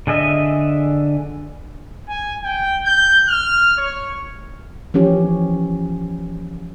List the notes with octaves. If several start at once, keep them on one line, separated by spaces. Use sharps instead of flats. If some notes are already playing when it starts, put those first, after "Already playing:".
D3 G#4 D#5 E5
G#5
G5
G6
F6
C#5
E3 F3 C#4 G4